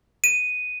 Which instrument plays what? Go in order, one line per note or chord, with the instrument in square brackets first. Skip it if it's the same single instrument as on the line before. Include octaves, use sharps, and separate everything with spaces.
[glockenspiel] D#7